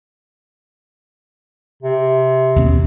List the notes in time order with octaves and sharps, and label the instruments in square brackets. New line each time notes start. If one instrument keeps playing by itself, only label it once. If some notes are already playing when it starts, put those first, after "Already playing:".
[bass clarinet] C3
[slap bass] D#2 B2 C#4